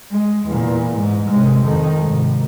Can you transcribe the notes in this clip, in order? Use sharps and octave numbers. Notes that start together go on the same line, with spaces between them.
G#3
E2 A#2
G#2
C3 G#3
F2 D#3
G#1 C3